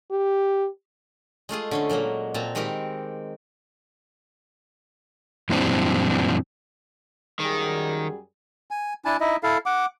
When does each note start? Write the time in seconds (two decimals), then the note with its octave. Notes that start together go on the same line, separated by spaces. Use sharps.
0.11 G4
1.49 G#3 A3 F4 G#4
1.71 D3 C#4 C6
1.89 A#2 F#3 G#3 A#3
2.34 A#2 C4 A5 A#5
2.55 D#3 G#3 C4 G4 A#4 B5
5.49 F#2 A#2 E3 G3 C4 D4
7.40 F#2 D#3 G3 G#4
8.71 G#5
9.05 D4 E4 G#5 A5
9.20 D#4 E4 D#5 E5
9.43 E4 A4 F5
9.66 F#5 D6